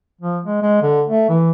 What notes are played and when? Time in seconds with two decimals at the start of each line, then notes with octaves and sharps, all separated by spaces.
0.21 F3
0.46 G#3
0.62 G#3
0.82 D3
1.08 A3
1.29 E3